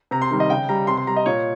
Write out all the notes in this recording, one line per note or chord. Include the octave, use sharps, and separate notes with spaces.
C3 A#5
C6
D#3 G3
D#5
C#3 G5
G3 A#5
C3 C6
C6
G3 A#5
D#5
A#2 C#5